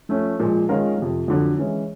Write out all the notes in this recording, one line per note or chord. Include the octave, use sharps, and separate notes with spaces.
F3 A3 C#4
A#2 F3 G#3
D#3 G#3 C#4 F4 A#4
F2 C3 F3
F2 D3 F#3
E3 G#3 C#4 E4